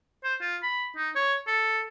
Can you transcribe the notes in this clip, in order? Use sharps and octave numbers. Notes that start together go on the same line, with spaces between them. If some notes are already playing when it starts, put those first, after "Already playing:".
C5
F4
B5
D#4
C#5
A4